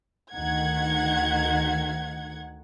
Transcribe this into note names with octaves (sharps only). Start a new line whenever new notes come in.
D2 D#3 F#5 G#6